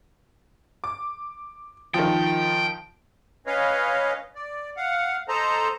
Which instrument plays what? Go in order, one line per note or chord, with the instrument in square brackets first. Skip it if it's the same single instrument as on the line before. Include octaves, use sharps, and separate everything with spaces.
[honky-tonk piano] D6
[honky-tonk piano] D#3 F3 [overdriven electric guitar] G5
[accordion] C#4 B4 C#5 D#5 F5
D5
F5 F#5
A4 C5 D#5 A5 A#5